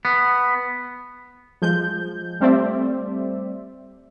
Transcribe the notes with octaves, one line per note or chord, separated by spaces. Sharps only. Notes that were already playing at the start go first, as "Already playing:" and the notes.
B3
F3 G#3 G6
G3 A3 C4 C5 D5 E5